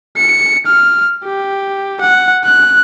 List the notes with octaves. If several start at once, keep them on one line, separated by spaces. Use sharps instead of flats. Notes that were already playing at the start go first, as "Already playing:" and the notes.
C#7
F6
G4
F#5
F#6